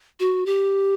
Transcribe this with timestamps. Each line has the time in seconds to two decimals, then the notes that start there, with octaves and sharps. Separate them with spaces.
0.20 F#4
0.46 G4